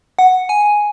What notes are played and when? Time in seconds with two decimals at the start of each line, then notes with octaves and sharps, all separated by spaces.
0.19 F#5
0.49 G#5